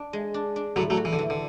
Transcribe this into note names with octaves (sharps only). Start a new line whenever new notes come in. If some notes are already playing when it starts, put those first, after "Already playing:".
Already playing: D4
G#3
D4
D4
A2 D3 F#3
F#3 A3
F#4
E3
D3
E3
D3